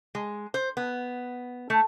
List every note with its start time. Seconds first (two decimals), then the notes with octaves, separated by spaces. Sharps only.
0.15 G#3
0.54 C5
0.77 B3
1.70 A3